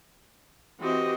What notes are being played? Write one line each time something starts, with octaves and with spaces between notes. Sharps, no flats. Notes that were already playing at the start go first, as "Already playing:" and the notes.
E3 C4 F#4 G4 D#5